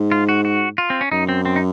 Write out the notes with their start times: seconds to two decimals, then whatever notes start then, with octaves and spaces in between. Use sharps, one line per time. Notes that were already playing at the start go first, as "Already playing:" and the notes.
Already playing: G#2
0.12 F4
0.29 F#4
0.45 F#4
0.78 F4
0.90 C4
1.01 C#4
1.12 F#2 D#4
1.29 C4
1.45 C4
1.56 D#4